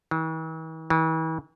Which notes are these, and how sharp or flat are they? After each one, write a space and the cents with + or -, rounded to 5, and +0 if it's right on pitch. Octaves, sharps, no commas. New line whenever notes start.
E3 -45
E3 -40